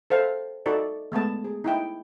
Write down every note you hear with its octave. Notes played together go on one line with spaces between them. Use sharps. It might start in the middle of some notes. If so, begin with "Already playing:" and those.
A4 C5 F5
D#4 F#4 A4 D5
G#3 A3 B3 A5
G#4
D#4 E4 G5